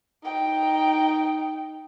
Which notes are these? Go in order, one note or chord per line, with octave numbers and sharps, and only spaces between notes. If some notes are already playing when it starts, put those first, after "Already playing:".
D#4 G5